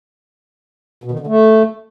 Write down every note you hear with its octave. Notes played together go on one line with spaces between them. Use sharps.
B2
D#3
D3
A3